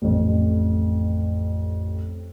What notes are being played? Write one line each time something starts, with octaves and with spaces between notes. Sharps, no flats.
A1 F2